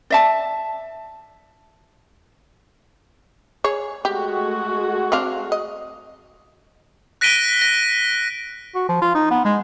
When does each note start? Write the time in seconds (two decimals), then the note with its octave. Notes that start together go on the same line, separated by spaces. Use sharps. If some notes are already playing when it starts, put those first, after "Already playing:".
0.10 D5 E5 A5
3.64 G#4 C#5
4.05 G#3 A3 F#4 G4
5.12 C4 D4 F5
5.52 D#5
7.21 F#6 A#6 B6 D7 D#7 G7
7.62 A#6
8.75 F#4
8.89 F3
9.02 F4
9.15 D#4
9.31 B3
9.45 G#3